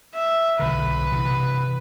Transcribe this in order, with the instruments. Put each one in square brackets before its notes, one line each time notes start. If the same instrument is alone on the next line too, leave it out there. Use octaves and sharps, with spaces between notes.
[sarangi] E5
[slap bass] B1 D3 [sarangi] B4
[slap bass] C3 E3